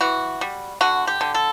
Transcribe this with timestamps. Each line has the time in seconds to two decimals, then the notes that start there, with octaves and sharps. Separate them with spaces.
0.01 E3 F#4
0.41 G3
0.81 D3 F#4
1.07 G4
1.21 D3
1.35 A4